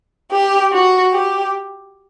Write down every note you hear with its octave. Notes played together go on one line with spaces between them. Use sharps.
G4
F#4
G4